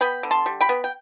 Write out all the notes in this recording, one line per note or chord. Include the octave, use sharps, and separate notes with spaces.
B3 G5 B5
D3
A5 C6
G3
G5 B5
B3
G5